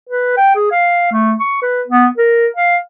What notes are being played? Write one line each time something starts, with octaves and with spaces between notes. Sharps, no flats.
B4
G5
G#4
F5
A3
C#6
B4
B3
A#4
F5